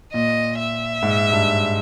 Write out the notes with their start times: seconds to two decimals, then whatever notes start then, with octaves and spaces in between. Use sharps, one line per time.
0.14 A#2 D#5
0.59 E5
1.03 G#2
1.32 G2